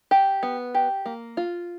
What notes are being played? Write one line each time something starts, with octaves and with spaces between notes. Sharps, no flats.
G4
B3
G4
A#3
F4